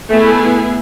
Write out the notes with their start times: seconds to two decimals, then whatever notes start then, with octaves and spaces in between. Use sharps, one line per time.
0.10 A3 B3 E4 G#4